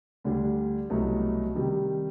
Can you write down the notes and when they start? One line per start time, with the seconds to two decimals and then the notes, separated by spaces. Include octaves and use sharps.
0.24 D2 D3 G3
0.90 C2 B2 F#3 A3
1.55 C3 D#3 G3